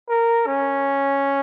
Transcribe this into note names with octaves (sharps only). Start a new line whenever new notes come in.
A#4
C#4